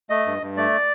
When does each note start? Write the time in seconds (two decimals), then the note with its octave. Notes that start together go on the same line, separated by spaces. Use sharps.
0.10 A3 D#5
0.26 G2
0.42 G2
0.57 A3 D5